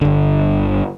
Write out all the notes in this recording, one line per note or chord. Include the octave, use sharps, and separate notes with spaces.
G1 D3